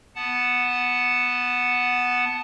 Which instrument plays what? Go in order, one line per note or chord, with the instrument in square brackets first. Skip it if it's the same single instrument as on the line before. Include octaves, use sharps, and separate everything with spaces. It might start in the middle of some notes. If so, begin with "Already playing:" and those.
[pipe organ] B3 F#5 A5